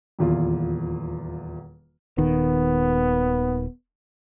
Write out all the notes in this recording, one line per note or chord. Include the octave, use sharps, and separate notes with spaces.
D#1 E2 F4
D#1 D#3 B3